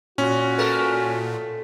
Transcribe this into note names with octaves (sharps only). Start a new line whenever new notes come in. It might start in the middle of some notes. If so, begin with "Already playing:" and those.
A#2 C#4 F#4
A3 A4 A#4